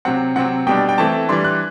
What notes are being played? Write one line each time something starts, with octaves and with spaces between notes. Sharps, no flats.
C3 F#3 C4 F#5
C3 F#3 C4 F#5
B2 G3 D4 G5
G5
E3 A3 C4 A5
E3 G3 D4 C6
F#6